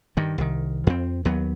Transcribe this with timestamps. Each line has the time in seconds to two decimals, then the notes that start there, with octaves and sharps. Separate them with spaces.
0.17 G2 D#3
0.38 C2 D#3
0.87 F2 C4
1.25 D#2 F#3 B3